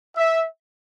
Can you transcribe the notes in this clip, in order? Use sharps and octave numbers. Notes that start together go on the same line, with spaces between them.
E5